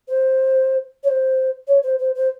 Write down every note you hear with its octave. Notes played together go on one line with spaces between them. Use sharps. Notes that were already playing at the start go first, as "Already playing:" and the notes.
C5
C#5
C5
C#5
C5
C5
C5